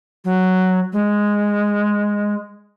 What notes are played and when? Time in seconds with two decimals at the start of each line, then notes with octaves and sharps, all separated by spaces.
0.25 F#3
0.93 G#3